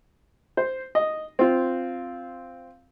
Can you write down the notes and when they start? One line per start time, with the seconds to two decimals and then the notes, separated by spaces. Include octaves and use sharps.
0.57 C5
0.95 D#5
1.39 C4 F4